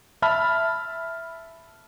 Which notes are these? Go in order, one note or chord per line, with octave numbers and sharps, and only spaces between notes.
E5 A5 B5 F6